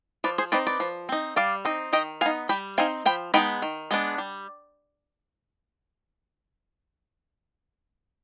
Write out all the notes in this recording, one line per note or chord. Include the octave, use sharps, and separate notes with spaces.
F3 B4 D5
G#4 C5
C4 D#4 B4 D5
B4 D5
F3
C4 D#4
G3 D5 F5
C4 D#4
D#3 D#5 G5
B3 D#4 F5 G#5
G3 G5 B5
C4 D#4 F5 G#5
F3 G5 B5
G#3 B3 D#4 G5 B5
D#3
G#3 B3 D4
G3